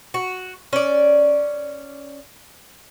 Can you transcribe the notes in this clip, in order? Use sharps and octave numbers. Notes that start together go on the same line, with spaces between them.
F#4
C#4 D5